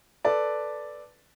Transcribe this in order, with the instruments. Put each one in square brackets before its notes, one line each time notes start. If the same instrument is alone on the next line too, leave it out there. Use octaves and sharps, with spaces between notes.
[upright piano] A4 B4 D5 A5